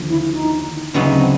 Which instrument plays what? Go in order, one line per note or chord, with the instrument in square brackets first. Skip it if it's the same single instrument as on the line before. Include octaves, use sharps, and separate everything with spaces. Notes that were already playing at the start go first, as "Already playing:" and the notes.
Already playing: [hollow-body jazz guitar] D#2 D3 F3
[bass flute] E4
D#4
[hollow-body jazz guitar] D2 C#3 F#3 B3 D#4 [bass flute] C#4
[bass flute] C4